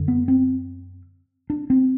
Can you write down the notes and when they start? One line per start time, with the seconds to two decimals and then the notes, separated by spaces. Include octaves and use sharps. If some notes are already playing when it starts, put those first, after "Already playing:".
Already playing: F#2 D3
0.08 B3
0.28 C4
1.50 D4
1.70 C4